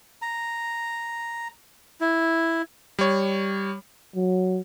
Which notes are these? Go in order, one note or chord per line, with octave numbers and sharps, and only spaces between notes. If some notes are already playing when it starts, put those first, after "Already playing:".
A#5
E4
G3 C#5
F#3